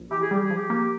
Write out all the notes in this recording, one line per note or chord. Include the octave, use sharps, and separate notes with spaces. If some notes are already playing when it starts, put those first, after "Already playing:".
Already playing: A#1
E3 G4
G#4
G3 G4
G#4
F3
G4
A#3